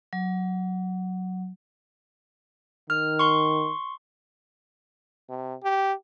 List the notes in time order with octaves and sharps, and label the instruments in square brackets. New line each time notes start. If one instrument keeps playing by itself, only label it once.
[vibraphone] F#3
[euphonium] D#3 [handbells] F6
[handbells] C6 C#6
[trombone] C3
G4